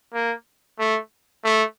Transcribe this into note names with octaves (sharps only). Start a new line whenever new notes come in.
A#3
A3
A3